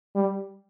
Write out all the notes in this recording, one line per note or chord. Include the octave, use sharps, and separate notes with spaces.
G3